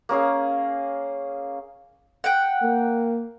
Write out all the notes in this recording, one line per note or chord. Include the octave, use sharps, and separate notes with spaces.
A#3 C#4 G#4 F5
F#5 G5
A#3